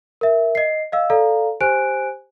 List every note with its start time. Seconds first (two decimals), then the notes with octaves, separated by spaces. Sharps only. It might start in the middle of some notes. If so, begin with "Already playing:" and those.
0.21 A#4 E5
0.55 D#5 C7
0.92 D#5 F5 E6
1.10 A4 D5 F5 A#5
1.61 G4 C5 G#5 F#6 D7